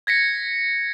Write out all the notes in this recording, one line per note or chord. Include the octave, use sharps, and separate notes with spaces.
G#6 A#6 B6 C#7